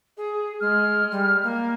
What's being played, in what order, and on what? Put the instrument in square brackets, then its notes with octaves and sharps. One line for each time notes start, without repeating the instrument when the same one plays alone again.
[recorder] G#4
[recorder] G#3 [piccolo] F6
[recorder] G3
A#3